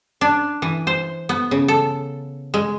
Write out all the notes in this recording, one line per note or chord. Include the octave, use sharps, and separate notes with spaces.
D4
E3
C5
B3
C#3
A4
G#3